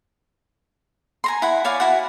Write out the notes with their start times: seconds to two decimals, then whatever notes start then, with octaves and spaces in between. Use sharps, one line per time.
1.24 G#5 A#5 C6
1.42 E4 F#5
1.65 C#5 D5 F5 G#5
1.80 E4 F#4 F#5